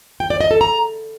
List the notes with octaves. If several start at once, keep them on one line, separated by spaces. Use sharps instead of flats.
G5
D5
D#5
A4
A#5